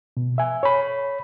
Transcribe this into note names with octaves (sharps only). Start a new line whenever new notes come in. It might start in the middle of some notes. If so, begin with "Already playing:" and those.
B2
E5 G#5
C#5 B5